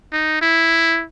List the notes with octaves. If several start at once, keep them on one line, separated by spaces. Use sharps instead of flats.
D#4
E4